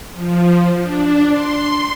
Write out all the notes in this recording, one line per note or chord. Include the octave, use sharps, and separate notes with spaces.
F3
D4
C6